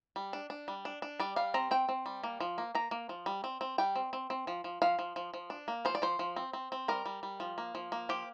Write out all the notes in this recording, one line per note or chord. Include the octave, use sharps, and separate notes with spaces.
G3
D4
D4
G3
D4
D4
G3 D5
G3 F5
C4 A#5
C4 G5
C4
G3
A#3
F3
A#3
A#3 A#5
A#3
F3
G3
C4
C4
G3 G5
C4
C4
C4
F3
F3
F3 F5
F3
F3
F3
D4
A#3
F3 C5
D5
F3 C5
F3
C4
C4
C4
G3 A#4
G3
G3
F3
A#3
F3
A#3
F3 G4